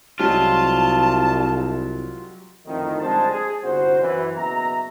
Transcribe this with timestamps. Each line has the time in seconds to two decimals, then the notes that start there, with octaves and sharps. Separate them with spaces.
0.19 C2 F#3 G#3 F4 G4 A5
2.65 F2 A2 D3 D#3
3.00 F2 D3 G3 G#3 C5 A5
3.29 G#4
3.63 G1 C2 F#4 C5
4.00 F#2 E3
4.36 F#1 B2 E5 A#5